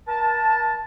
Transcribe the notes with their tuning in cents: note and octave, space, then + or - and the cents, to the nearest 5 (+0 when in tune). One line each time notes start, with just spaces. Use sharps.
A#4 +35 A5 +0